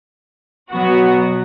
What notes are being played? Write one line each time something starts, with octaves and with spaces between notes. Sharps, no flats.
B2 F#3 B3 F#4